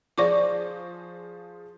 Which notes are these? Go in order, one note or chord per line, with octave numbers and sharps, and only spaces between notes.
F3 G#4 C5 D5 C#6 D6